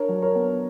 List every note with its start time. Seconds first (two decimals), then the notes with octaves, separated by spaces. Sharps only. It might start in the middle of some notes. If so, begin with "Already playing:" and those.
Already playing: D4 A#4 C#5
0.09 F#3
0.22 A#4 C#5
0.35 B3